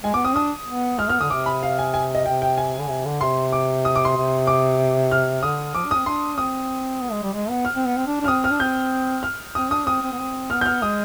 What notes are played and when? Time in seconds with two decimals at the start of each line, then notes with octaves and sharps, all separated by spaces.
0.04 G#3 G#5
0.14 B3 D6
0.24 C4 D#6
0.35 D4 D#6
0.67 B3
0.98 G#3 F6
1.09 B3 F6
1.20 D3 D#6
1.30 C3 D6
1.46 B5
1.63 F5
1.79 G#5
1.94 G#5
2.15 D#5
2.26 C3 G5
2.42 G5
2.58 G#5
2.79 D3
2.89 C3
3.05 D3
3.21 C3 C6
3.52 D6
3.85 D#6
3.96 D6
4.05 C6
4.16 C3
4.47 D6
5.11 F6
5.43 D3 D#6
5.75 F3 D6
5.85 D4
5.91 C4 D#6
6.06 D4 C6
6.38 C4 D#6
7.01 B3
7.12 G#3
7.23 G3
7.33 G#3
7.49 B3
7.65 F6
7.75 C4
7.86 B3
7.96 C4
8.07 D4
8.21 D4
8.24 F6
8.28 C4 D#6
8.44 F6
8.51 D4
8.60 C4 G6
9.23 F6
9.55 C4 D#6
9.71 D4 D#6
9.87 C4 D#6
10.02 C4
10.12 B3
10.18 C4
10.50 B3 F6
10.61 G6
10.66 F6
10.82 G#3 D#6